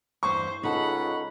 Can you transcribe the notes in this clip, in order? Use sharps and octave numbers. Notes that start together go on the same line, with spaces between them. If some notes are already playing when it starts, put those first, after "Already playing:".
E2 G2 C5 C#6
C#2 D#4 A4 F#5 B5